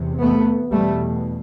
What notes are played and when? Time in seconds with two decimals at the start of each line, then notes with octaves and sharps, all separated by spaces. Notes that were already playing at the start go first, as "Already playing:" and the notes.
Already playing: E2 C3
0.21 A3 B3
0.71 E2 B2 G3 A3